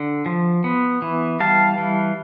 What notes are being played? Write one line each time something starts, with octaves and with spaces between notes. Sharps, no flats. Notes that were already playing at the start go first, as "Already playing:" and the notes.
Already playing: D3
F3
B3
E3
G3 F5 A5
E3